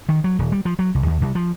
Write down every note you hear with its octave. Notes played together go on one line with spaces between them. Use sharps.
D#3
F#3
D#1
G3
F3
F#3
C2
D#2
C2
F3